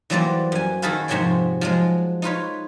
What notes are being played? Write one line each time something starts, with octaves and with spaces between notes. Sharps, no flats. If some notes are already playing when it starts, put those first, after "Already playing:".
E3 F#3 G3 A#3 C5 D5
F#2 G#5
D#3 F#4 G#4 A4 B4 F5
F2 G#2 C3 F#4 C#5 G5
F3 F#3 G#3
D#4 F4 B4 C#5